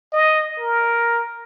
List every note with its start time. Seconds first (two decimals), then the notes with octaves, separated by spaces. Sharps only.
0.13 D#5
0.59 A#4